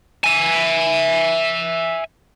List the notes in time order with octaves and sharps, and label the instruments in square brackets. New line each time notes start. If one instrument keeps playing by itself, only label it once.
[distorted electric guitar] E5 G#5